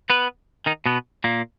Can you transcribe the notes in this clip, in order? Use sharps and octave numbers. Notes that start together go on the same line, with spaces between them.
B3 B4
D#3 D#4
B2 B3
A#2 A#3